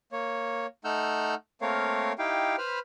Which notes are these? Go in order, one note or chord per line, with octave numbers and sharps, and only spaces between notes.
A#3 C#5
A3 D#4 F#5 E6 F6 G6
A3 A#3 C4 A#4 C#5 F5
D#4 E4 G4 F5 G5
B4 C5 B5 F6